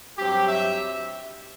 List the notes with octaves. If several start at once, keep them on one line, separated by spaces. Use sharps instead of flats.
G2 F#3 C4 G4
E5